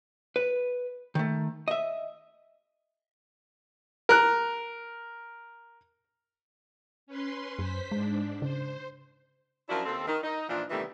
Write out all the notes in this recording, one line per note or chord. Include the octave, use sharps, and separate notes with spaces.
B4
D#3 A3
D#5 E5
A#4 F#6
C#4 B4 C6
F#2 C5 B6
G#2 G#3 D4
C#3 C5
F#2 F3 D4 E4 F#4 A#4
D#2 C4 A4
D#3
D#4
A#2 E3 F3 D4 F4
C3 D#3 E3 G3 A3 B3